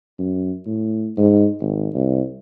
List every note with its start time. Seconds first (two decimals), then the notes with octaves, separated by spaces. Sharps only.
0.19 F#2
0.67 A2
1.18 G#2
1.61 G#1
1.94 C2